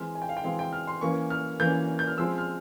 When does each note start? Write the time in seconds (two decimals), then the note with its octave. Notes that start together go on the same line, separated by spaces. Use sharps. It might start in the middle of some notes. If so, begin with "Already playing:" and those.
Already playing: E3 G#3 C4 F6
0.15 G#5
0.22 G5
0.29 F5
0.37 G5
0.44 E3 G#3 C4 F5
0.59 G5
0.73 F6
0.87 C6
1.01 E3 A#3 C#4 C#6
1.30 F6
1.60 E3 A#3 C#4 G6
1.99 G6
2.07 F6
2.18 F3 G#3 C4 E6
2.38 F6